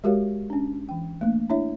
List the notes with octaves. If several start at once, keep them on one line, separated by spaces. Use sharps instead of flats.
G#3 F#4 G4 A#4 C#5 F5
C#4 D4
E3 G5
A3 A#3 D4
D4 E4 C#5 E5